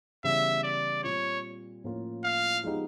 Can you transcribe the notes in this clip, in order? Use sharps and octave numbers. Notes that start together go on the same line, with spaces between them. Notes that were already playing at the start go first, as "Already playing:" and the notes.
C#3 E3 G3 B3 E5
D5
A#2 G3 C4 F4 C#5
A2 F3 A#3 C#4 F4
F5
F3 G#3 B3 D#4 G4